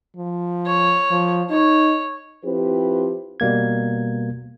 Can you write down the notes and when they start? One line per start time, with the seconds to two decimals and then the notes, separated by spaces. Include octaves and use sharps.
0.16 F3
0.66 C#5
1.11 F3
1.50 D#4 C#5
2.45 F3 C4 E4 G4 B4 C5
3.40 B2 G3 A#3 G#6